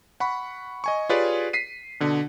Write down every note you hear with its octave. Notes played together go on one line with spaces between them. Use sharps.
F#5 B5 C#6
D#5 G#5 C#6
F4 G4 G#4 B4 C#5 D5
B6 C7 D#7
B2 D3